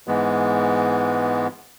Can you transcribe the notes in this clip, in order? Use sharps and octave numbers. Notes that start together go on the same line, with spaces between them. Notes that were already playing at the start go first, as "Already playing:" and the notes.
G#2 E3 G#3 B3